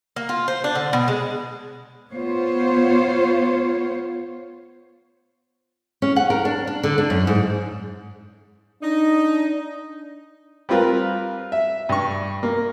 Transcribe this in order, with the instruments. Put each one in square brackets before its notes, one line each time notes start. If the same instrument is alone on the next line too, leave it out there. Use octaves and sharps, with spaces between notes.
[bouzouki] A#3
F4
C5
D4
D3
B2
G#3
[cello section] B3 F4 C5 C#5
[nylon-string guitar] C#4
F#5
A#4
D4
D4
D3
D4
F#2
G#2
[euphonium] D4 [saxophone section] D#4
[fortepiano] G3 C4 F4 A#4 B4
E5
G2 C#6
A#3